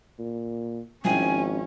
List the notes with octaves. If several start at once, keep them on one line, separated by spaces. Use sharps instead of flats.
A#2
G#1 F3 C#4 E4 G5 G#5